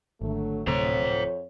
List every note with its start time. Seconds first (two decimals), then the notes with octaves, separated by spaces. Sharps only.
0.21 G#1 D3 F#3 A3
0.67 D1 F2 C3 A3 C5 C#5 A#5